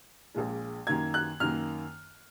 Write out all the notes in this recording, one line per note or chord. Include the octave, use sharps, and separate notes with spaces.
A#1 A#2 G#3
F#2 D#3 A#3 G#6
F#6
F#2 D#3 A#3 F6